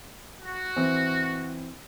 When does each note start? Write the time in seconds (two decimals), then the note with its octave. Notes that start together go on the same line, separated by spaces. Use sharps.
0.40 F#4
0.76 E3 C4